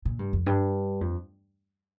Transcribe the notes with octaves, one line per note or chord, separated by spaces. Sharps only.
A#2
G2
F2
G2
F2